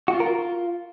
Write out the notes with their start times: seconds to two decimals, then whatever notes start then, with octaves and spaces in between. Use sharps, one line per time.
0.08 F#4
0.14 F4
0.20 A#4
0.26 F4